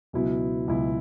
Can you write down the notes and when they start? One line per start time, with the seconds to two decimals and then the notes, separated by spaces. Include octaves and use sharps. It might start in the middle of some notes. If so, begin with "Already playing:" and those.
0.13 C#2 B2 F#3 B3 E4
0.68 C#2 B2 F#3 B3 E4